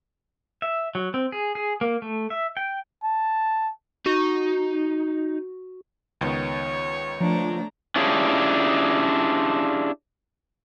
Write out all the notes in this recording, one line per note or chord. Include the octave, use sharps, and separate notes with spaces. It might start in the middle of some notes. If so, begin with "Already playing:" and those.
E5
F#3
C4
G#4
G#4
A#3
A3
E5
G5
A5
D#4 F#4
C#2 D#3 B3 C#5
F3 A3 D4 A#5
C#4 D4 E4 F4 G4 G#4